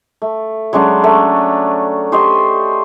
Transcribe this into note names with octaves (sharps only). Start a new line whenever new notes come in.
A3
F#3 G#3 C#4 D4
A3
G4 C5 C#5 D#5